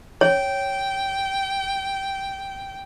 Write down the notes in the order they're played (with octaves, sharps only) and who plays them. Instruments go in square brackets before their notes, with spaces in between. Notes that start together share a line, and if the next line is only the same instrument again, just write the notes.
[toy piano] C#5 [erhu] G5